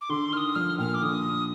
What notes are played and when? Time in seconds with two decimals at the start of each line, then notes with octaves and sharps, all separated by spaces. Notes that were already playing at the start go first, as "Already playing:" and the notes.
0.01 D6
0.09 D3 C6
0.32 D#3 F6
0.37 D#6
0.55 F3 F6
0.78 A#2 F6
0.94 D6
1.03 D3 D#6